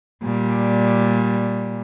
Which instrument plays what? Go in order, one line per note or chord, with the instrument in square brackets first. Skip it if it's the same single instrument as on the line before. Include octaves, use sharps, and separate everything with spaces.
[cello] A#2 G3